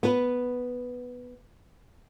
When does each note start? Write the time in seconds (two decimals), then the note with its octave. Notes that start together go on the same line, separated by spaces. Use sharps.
0.03 B3 B4